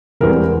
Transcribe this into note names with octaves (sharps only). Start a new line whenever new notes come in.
E1 E2 E3 G3 C4 A#4